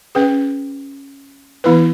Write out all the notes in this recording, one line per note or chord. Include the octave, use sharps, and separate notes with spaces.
C#4 G#4 B4
E3 B3 E4 B4